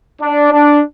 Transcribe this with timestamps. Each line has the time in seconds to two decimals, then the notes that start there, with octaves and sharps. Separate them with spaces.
0.22 D4
0.53 D4